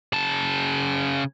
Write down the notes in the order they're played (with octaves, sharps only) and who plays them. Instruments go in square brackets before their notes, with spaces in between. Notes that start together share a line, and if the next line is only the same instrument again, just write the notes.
[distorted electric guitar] C#3 A5